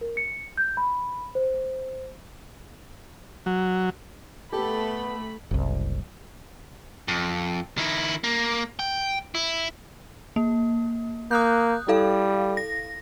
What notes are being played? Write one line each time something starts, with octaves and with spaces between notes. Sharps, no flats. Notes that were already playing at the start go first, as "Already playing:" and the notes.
A#4
C#7
G6
B5
C5
F#3
A3 B3 G4 A4 B5
F#1 C2
F2
D#3 E4
A#3
G5
E4
A#3
A#3 D#6 F#6 G6
G3 E4 A4 F5
A#6